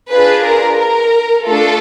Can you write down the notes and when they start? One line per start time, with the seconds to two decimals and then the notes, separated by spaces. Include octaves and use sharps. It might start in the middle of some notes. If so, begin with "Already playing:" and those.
0.12 D4 F4 G#4 B4
0.45 A#4
0.79 A#4
1.45 A3 D4 F4 A4